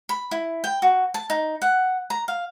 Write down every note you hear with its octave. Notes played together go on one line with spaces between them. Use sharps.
B5
E4
G5
F#4
A5
D#4
F#5
A#5
F5